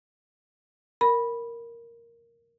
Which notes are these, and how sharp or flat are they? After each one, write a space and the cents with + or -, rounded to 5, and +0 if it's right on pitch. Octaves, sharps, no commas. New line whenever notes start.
A#4 +0 B5 -10